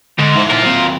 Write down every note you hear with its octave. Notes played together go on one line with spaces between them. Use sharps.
G#2 D3
D#4 E4 C5
F4 A#4
F#3 C4